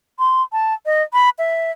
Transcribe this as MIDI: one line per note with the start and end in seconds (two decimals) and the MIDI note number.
0.19 0.43 84
0.53 0.74 81
0.86 1.03 75
1.13 1.30 83
1.39 1.71 76